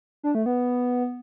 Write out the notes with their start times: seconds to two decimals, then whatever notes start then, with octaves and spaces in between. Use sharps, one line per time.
0.23 D4
0.35 A3
0.46 B3